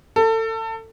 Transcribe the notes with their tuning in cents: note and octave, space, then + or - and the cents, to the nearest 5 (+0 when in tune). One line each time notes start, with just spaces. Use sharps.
A4 +30